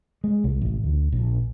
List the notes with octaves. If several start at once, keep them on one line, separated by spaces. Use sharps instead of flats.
G#3
C2
A1
D2
A#1